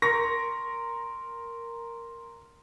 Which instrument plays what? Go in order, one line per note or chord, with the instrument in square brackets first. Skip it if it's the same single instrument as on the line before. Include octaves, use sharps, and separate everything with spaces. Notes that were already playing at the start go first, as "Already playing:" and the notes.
[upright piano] A#4 [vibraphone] C6 [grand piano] C#6 A#6